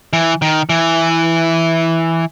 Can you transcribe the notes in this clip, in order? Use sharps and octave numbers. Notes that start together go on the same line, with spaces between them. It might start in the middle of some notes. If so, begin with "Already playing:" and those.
E3
D#3
E3